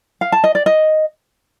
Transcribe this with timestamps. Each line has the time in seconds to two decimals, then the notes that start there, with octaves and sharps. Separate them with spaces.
0.21 F5
0.32 A5
0.44 D#5
0.55 D5
0.66 D#5